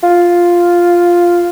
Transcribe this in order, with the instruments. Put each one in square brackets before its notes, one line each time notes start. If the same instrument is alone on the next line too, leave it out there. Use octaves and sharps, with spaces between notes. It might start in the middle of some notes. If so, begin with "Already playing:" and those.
[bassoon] F4